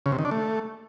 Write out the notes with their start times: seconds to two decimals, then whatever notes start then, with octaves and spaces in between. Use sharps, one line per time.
0.06 C#3
0.12 C3
0.19 D#3
0.25 D4
0.31 A3